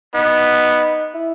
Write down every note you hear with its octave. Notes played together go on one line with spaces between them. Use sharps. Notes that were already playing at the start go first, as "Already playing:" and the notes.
B3 D#4
E4